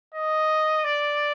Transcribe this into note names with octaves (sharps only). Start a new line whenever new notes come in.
D#5
D5